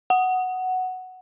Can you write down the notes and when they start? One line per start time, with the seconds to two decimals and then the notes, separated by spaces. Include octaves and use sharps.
0.10 F#5